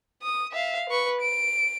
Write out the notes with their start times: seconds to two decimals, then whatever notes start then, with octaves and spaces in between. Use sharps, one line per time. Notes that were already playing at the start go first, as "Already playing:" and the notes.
0.22 D#6
0.52 E5 F5
0.90 B4 C#6
1.21 D7